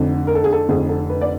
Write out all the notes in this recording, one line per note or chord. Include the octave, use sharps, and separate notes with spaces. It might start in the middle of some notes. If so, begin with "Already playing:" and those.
Already playing: F1 F2 D3
A#4
A4
G#4
A4
F1 F2 D3 G#4
A4
B4
D5